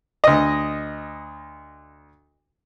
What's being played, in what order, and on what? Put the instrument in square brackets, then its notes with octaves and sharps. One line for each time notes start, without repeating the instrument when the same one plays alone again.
[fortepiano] D2 D#5